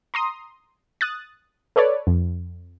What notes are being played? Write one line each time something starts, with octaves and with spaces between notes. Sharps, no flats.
A#5 C6 D#6
D#6 F#6 A6
A4 B4 C#5 D5
F2